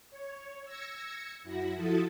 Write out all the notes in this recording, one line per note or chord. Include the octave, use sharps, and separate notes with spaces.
C#5
E6 G#6 A#6 C#7
F#2 E4 F#4 A#6
F3 E4 F#4 A4 D#6 A6